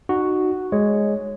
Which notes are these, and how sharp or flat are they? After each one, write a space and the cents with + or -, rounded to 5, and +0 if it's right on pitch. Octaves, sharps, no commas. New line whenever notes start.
D#4 -30 F#4 +0
G#3 +0 C#5 +0